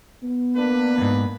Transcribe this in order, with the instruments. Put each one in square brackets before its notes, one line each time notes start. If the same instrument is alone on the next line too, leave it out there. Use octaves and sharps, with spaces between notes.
[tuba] B3
[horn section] A#3 D4 B4
[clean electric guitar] D#2 G#2